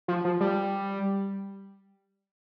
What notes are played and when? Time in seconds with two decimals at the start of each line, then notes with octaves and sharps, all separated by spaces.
0.08 F3
0.25 F3
0.41 G3